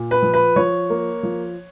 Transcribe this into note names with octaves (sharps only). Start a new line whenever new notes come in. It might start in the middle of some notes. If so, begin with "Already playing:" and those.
Already playing: A#2
B4
F3
B4
F3 C#5
A#3
F3